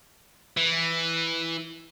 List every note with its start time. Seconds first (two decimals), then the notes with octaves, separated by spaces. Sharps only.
0.57 E3